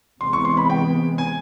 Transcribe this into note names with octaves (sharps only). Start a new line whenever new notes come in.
C3 E3 G#3 B3 C6
C#6
C6
B5
G5
G#5